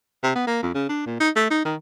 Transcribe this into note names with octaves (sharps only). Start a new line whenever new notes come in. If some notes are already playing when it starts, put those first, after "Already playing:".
C3
B3
A#3
F2
C#3
D4
A#2
D#4
A3
D#4
D#3